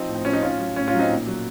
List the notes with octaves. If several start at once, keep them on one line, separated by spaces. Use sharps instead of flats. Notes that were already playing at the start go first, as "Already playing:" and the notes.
Already playing: F3 C4 D#4
A2
C4
F3 C#4
D#4
A2 C#4 F4
F#3
A2 C#4
C#4 F4
F#3
C4 D#4
A#2
F#3